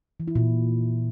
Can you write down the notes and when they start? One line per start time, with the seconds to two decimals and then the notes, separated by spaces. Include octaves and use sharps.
0.20 E3
0.28 E4
0.35 A#2